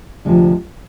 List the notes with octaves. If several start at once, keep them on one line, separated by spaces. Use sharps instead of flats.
D2 C3 F3 G#3